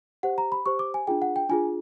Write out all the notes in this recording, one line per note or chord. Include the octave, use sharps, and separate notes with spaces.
G4 C5 F#5
A#5
B5
G4 C5 C#6
D6
G#5
D4 F4 G#4 G5
F#5
G5
D4 F4 G#4 G#5